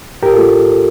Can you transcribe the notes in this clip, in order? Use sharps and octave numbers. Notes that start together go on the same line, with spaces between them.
A2 G4 A#4
F4 A4
A3